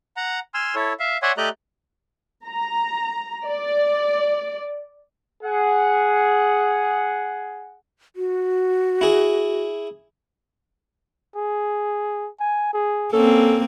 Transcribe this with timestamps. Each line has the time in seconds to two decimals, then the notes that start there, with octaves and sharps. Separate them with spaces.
0.17 F#5 A#5
0.54 G#5 C6 E6 F6
0.75 E4 A4 C#5
1.00 E5 F5
1.22 C#5 D5 E5 F#5 G#5 C6
1.37 A3 G4 D5 D#5 A#5 F#6
2.46 A#5
3.46 D5
5.44 G#4 F#5
8.16 F#4
9.01 E4 G#4
11.36 G#4
12.40 G#5
12.73 G#4
13.13 A#3 C4 C#4 A4